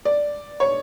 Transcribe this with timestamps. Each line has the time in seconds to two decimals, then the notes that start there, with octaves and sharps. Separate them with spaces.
0.05 D5
0.60 C#5